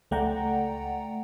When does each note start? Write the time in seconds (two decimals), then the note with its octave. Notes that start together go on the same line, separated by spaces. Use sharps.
0.11 C#2 A3 D5 F#5 G5 A#5